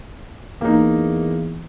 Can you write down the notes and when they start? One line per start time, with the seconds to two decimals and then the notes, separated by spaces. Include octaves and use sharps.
0.61 E2 A#3 D#4